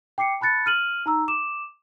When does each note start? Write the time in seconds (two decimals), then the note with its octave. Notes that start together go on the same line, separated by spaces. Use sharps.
0.18 G5 D6 C7 C#7
0.41 A5 B5 F#6 A6 C#7
0.66 F6 D#7 F#7
1.06 D#4 A#5 E6
1.28 D6 E7